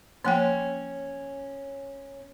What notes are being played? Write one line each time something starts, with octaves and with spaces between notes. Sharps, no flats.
F3 A#3 C#4 G5